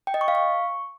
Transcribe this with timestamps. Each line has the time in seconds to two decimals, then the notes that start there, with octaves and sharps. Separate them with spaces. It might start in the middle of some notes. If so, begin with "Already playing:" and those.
0.07 G5
0.14 D#5
0.21 C#6
0.28 F5
0.35 C#6